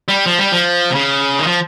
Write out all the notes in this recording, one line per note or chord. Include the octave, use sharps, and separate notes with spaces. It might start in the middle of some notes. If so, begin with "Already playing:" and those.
G3
F3
G3
F3
C3
C#3
D#3
F3